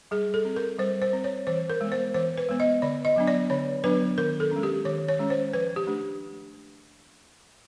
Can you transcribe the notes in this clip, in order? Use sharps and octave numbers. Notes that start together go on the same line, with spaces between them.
G3 G#4
A4
C4
A#4
G3 C5
C5
C4
C#5
E3 C5
A#4
G#3 B3
C5
E3 C5
B4
G#3 B3
D#5
D3 D5
D#5
F#3 B3 D4
D5
D3 C#5
F#3 B3 D4 B4
D#3 A#4
A4
G#3 C#4
G4
D#3 C#5
C#5
G#3 C#4
C5
F3 B4
G4
A3 D4